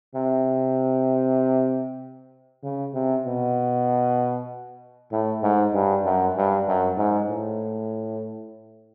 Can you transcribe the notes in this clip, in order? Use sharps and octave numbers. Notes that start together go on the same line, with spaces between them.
C3
C#3
C3
B2
A2
G#2
G2
F#2
G2
F#2
G#2
A2